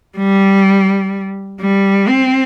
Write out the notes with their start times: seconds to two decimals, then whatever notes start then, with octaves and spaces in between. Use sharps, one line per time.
0.18 G3
1.61 G3
2.08 C4